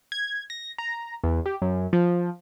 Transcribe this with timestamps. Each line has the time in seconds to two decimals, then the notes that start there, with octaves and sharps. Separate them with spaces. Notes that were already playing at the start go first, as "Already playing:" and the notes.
0.12 G#6
0.50 A#6
0.78 A#5
1.24 E2
1.46 G4
1.62 F#2
1.93 F3